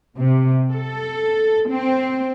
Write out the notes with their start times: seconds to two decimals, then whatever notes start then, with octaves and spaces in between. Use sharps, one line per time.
0.18 C3
0.72 A4
1.69 C4